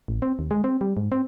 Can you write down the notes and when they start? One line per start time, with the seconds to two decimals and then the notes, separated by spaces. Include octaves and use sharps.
0.08 A1
0.22 C4
0.39 D#2
0.51 G#3
0.64 C4
0.81 G3
0.97 G#2
1.12 C4